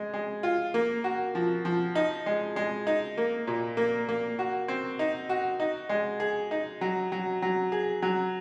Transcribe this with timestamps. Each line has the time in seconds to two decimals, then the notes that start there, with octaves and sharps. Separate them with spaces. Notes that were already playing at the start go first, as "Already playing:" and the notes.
Already playing: G#3
0.14 G#3
0.43 F4
0.74 A#3
1.04 F#4
1.35 F3
1.65 F3
1.95 D#4
2.26 G#3
2.56 G#3
2.87 D#4
3.18 A#3
3.47 A#2
3.77 A#3
4.09 A#3
4.39 F#4
4.68 C4
4.99 D#4
5.29 F#4
5.60 D#4
5.89 G#3
6.20 G#4
6.51 D#4
6.81 F#3
7.12 F#3
7.42 F#3
7.72 G#4
8.02 F#3